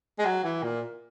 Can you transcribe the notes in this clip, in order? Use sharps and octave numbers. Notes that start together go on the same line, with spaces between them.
G#3
F#3
E3
A#2